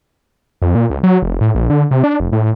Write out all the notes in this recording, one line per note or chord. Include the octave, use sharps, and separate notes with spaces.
F2
A#2
C#2
F#3
F1
A2
A#1
D3
C3
D4
F1
A2